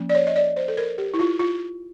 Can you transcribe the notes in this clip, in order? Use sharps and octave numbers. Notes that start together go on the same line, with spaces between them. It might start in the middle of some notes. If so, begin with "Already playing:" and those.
Already playing: F3 A#3 C#4
D5
C#5
D#5
D5
C5
A4
A#4
G4
E4
F4
F4